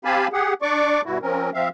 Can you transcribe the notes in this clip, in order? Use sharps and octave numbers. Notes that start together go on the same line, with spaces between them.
C4 G4 F5 G#5 A5 B5
G4 G#4 F#5
D4 D5 C#6 D6
G2 B2 E4 F#4
F3 C4 C#4 A#4
F3 C4 E5 F5